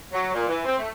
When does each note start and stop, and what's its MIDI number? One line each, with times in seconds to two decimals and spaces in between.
0.12 0.32 54
0.32 0.47 46
0.47 0.61 52
0.64 0.74 60
0.78 0.88 57